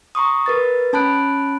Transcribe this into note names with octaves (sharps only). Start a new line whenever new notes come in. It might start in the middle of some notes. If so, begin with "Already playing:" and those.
A#5 C6 C#6 D#6
A#4 B4 A6
C#4 A5 B5 F#6 D7